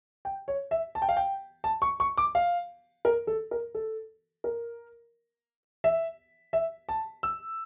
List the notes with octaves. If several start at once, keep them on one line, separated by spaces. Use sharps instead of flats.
G5
C#5
E5
A5
G5
F5
G5
A5
C#6
C#6
D6
F5
A#4
A4
A#4
A4
A#4
E5
E5
A5
E6